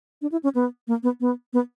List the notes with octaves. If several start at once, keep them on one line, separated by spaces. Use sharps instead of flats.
D4
E4
C#4
B3
A#3
B3
B3
B3